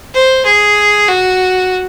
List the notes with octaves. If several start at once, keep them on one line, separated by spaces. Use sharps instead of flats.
C5
G#4
F#4